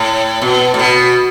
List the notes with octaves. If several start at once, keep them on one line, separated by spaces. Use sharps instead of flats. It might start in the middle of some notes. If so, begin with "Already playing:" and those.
Already playing: A2
B2
A2
B2